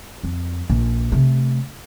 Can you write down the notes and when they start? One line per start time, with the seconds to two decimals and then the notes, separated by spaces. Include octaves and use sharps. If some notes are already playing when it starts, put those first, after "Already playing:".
0.23 F2
0.70 A#1
1.12 C3 A3